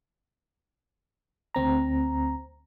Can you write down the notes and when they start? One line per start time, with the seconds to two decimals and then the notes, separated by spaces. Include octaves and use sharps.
1.55 D2 C4 A#5